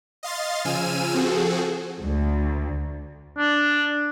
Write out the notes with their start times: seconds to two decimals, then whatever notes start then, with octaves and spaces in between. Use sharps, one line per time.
0.23 D#5 F5 C6 A6
0.65 C#3 F3 G#5 E6 F6 D#7
1.14 F3 C4 F#4 G#4 A4
2.02 D2
3.38 D4